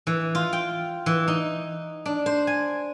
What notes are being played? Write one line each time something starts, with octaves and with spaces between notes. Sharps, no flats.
E3
F4
G5
E3
D#4
D4
C5
G#5